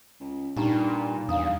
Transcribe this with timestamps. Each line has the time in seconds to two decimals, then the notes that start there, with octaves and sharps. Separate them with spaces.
0.20 C#2
0.57 G2 A#2 D#4 G4 A#5
1.29 E2 G2 F5 A#5 D#6